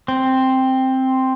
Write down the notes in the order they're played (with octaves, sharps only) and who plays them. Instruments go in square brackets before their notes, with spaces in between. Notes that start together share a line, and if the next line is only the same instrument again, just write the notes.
[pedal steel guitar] C4